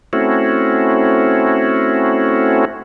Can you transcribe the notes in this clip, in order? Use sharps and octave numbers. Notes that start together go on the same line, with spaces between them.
A3 C4 C#4 E4 F#4